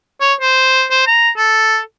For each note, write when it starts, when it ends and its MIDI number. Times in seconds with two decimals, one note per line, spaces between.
0.21 0.34 73
0.41 0.85 72
0.91 1.02 72
1.07 1.30 82
1.37 1.79 69